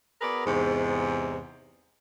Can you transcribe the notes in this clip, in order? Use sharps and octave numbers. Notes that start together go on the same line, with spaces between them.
B3 F#4 G#4 A#4 B4 D5
E2 G#2 C3